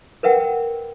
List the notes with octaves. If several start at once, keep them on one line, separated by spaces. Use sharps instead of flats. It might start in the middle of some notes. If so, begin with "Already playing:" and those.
A#4 B4 E5 F#5 G5